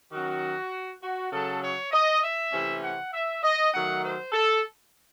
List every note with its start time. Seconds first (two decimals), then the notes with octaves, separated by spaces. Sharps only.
0.11 D#3 F#3 C#4 F#4
1.01 F#4
1.31 C#3 F#3 C#4 A4
1.62 C#5
1.92 D#5
2.21 E5
2.52 C3 E3 A3 C#4
2.82 F#5
3.12 E5
3.42 D#5
3.72 D#3 F#3 A3 D#4 F#5
4.02 C5
4.32 A4